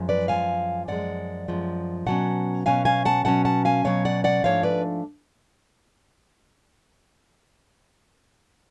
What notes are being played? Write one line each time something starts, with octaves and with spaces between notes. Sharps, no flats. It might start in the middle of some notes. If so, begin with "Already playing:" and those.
Already playing: F#2 F3 G#3
B4 D5
F#2 F3 G#3 F5 G#5
F#2 F3 G#3 D5 F#5
F#2 F3 G#3
B2 F#3 C#4 F#5 A5
B2 F#3 C#4 F5 G#5
F5 G#5
F#5 A5
B2 F#3 C#4 F#5 A5
F#5 A5
F5 G#5
B2 F#3 C#4 C#5 F5
D5 F#5
D5 F#5
G#2 F3 A3 D4 C#5 F5
B4 D5